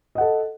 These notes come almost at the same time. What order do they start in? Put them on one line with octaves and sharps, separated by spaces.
D#5 F#5 A4